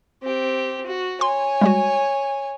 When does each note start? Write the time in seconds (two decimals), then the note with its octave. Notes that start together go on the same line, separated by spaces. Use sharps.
0.22 C4 G4
0.86 F#4
1.21 C#5 G#5 C6
1.61 G3 G#3 F#4